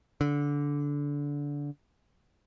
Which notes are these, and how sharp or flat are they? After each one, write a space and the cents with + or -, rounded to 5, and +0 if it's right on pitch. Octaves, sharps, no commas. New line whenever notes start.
D3 -20